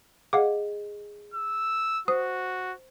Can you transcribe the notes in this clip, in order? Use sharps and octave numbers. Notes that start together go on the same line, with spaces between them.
G#4 D#5 F5 F#5 D6
E6
F#4 C5 D#6